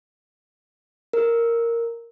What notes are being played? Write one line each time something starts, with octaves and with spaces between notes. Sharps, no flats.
A#4